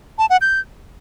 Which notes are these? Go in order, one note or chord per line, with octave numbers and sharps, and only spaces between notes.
A5
F#5
G6